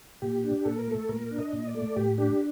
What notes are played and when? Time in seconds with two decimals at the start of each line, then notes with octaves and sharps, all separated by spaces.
0.22 A#2 G4
0.44 D4
0.65 A#2 A4
0.78 A#4
0.88 A3 A4
1.09 A#2 A#4
1.31 D4
1.38 D#5
1.53 A#2
1.67 D5
1.75 A3
1.96 A2 G4
2.18 D4 G4